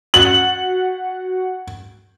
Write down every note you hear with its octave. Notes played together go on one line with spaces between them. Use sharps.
F#4 F#5 F#7